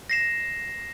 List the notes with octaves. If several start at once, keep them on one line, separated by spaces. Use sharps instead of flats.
A#6 C7 E7